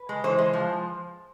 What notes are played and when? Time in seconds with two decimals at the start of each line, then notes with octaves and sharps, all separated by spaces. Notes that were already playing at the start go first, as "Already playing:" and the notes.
Already playing: B4
0.09 G#3
0.24 E3 C5
0.38 G#3
0.53 F3